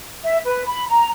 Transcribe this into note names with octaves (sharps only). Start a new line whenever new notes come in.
E5
B4
B5
A#5